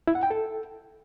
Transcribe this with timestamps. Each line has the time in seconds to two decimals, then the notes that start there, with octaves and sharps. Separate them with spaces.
0.07 E4
0.15 F#5
0.23 G5
0.31 A4